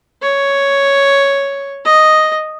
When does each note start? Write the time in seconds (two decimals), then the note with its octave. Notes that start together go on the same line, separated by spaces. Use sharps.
0.23 C#5
1.85 D#5